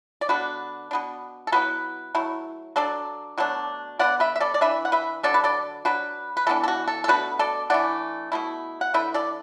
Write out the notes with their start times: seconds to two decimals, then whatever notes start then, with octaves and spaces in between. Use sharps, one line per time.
0.21 D5
0.29 D3 B3 D4 F#4 B4
0.91 B2 B3 D4
1.47 A4
1.52 F#3 B3 E4 F#4 B4
2.15 F#3 A3 E4
2.76 F#3 D4 A4 D5
3.38 B2 F#3 A3 D4
3.99 D3 B3 E4 D5 F#5
4.20 B4 E5
4.36 E5
4.40 A4 D5
4.54 D5
4.61 E3 D4 B4 E5
4.85 F#5
4.92 B4 E5
5.23 D3 F#3 D4 A4 D5
5.34 B4
5.44 A4 D5
5.85 F#3 D4 F#4 B4
6.37 B4
6.47 E3 B3 D4 A4
6.64 A4
6.68 F#4
6.88 A4
7.04 A4
7.08 B2 A3 D4 F#4 B4
7.39 A4 D5
7.70 E3 A3 D4 D5 F#5
8.32 B2 A3 E4
8.81 F#5
8.94 D3 A3 E4 B4 E5
9.14 A4 D5